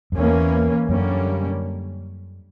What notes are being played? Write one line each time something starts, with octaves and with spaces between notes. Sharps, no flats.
F#2
E2 E3 A#3 C#4
F#2 D3 G3 A#3 C#4